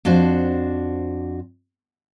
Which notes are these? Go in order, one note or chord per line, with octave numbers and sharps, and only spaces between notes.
F2 D4 F#4 C5